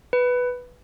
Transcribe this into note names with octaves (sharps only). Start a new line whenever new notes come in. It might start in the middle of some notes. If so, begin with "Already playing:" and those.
B4